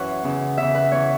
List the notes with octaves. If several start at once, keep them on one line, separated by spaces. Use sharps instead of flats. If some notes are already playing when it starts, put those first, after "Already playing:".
Already playing: F#2 E3 B4 C#5 F#5
E2 C#3 E3
E2 C#3 E3 E5
B4
E2 E3 C#5